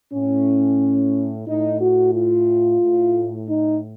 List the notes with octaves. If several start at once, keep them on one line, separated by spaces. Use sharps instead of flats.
A2 C#4
A2 D#4
F#4
F4
A2
D#4